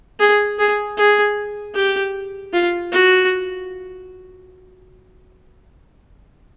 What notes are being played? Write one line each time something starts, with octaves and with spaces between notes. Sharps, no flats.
G#4
G#4
G#4
G4
F4
F#4